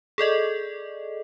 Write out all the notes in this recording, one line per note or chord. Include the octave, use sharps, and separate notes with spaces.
G#4 A4 D5 D#5